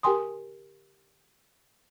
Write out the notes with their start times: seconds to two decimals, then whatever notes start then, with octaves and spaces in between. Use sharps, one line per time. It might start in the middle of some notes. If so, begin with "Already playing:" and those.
0.03 G4 A#4 G5 G#5 C6 D#6